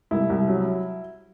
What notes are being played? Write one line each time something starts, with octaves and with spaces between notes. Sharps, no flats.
C2 E4
C2
F#3